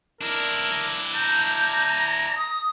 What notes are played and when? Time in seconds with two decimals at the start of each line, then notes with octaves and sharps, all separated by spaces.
0.21 D4 E4 A#4
1.15 A#5 G6
2.36 D#6